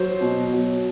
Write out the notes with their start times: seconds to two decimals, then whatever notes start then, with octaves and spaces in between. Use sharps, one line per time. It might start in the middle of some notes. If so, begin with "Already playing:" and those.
Already playing: F#3 C5
0.21 B2
0.53 F#3